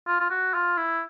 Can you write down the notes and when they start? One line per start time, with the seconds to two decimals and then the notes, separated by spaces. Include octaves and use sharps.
0.08 F4
0.20 F4
0.30 F#4
0.54 F4
0.77 E4